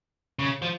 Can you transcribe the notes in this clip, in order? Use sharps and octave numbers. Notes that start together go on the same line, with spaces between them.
C#3
F3